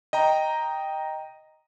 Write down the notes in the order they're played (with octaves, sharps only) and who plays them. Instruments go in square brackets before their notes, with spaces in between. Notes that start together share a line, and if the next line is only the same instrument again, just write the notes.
[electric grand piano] D#5 G5 A#5